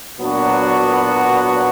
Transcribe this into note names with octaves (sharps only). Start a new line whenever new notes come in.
A#2 F#3 B3 D4 F#4